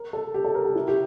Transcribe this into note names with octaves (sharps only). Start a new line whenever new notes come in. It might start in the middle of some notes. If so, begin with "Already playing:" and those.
Already playing: A#4
A4
G4
A4
A#4
G4
E4
G4